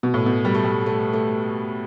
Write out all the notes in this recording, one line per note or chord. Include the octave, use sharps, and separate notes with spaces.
B2
A2
B2
G3
A3
G3
A3
A3